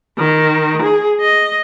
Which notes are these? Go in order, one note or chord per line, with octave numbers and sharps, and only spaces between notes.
D#3
G#4
D#5